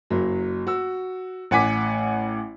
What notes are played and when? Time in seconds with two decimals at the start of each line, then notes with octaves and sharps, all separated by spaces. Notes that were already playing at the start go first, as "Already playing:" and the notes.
0.10 F#1 F#3
0.67 F#4 E6
1.51 A1 F#5 G#5 D6 B6